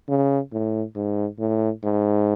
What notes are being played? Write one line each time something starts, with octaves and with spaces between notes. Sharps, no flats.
C#3
A2
G#2
A2
G#2